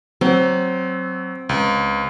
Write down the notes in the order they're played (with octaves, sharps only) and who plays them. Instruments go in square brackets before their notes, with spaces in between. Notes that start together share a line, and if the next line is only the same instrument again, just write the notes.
[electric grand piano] F#3 [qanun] C4
[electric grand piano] C#2